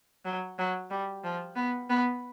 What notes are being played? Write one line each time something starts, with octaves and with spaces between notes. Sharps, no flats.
F#3
F#3
G3
F3
B3
B3